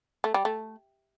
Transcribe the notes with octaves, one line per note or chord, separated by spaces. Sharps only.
A3
G3
A3